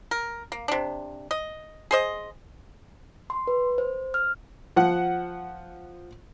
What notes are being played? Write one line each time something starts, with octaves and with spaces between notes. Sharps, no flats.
A#4
A#3
C3 D4
D#5
G#4 C5 D#5
C6
B4
C5
F6
F3 F#5